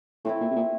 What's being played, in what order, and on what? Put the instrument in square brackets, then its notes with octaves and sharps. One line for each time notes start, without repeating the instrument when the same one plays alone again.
[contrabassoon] A2 [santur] A3 C4 E4
[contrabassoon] A#2
C3
A#2